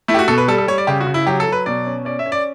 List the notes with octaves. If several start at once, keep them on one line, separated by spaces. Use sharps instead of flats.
A3 E4
G4
F#4
B2 A4
B4
G3 A4
A4
G3 C#5
D5
C#3 G4
F#4
C#3
E4
F#3 G4
A4
F#3
B4
B2 D5
C#4
C#4 D5
E5
C#4
D5